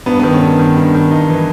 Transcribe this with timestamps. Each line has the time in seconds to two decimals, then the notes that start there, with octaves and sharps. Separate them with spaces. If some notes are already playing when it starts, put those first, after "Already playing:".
0.06 G2 B3
0.19 D#3 B3
0.32 C#4
0.42 G2
0.59 D#3
0.77 G2
0.95 D#3
1.11 G2 D#4
1.29 E3